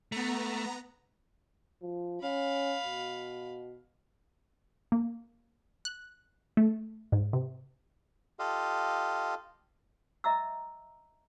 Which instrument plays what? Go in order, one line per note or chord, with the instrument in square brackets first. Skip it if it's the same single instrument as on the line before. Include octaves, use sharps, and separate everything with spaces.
[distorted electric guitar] A3 [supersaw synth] B3 A#5
[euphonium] F3
[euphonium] C#4 [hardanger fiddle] F5 B5
[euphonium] B2
[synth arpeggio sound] A#3
F#6
A3
G#2
C3
[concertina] F4 G4 A4 D#5 F5
[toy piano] D#5 E5 A#5 D6 E6